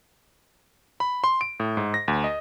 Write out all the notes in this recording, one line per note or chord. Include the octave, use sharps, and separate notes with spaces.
B5
C6
D7
A2
G#2
A#6
D2
D#5